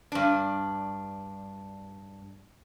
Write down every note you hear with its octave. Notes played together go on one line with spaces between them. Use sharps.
G2 D4